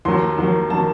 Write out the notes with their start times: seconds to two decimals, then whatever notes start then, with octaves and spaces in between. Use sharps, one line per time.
0.05 D#2 D#3 F#3 C6
0.38 D#2 D#3 F#3
0.70 D#3 F#3 A5